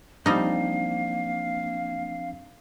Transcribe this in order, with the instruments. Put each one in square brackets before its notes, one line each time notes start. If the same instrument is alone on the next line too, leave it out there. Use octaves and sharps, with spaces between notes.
[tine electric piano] F3 C4 D4 [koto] G3 D#4 [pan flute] A#3 [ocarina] F5